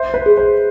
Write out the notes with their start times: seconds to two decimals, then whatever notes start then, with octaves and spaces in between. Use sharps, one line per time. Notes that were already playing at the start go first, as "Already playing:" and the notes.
Already playing: C5 E5
0.14 B4
0.26 G#4
0.37 C5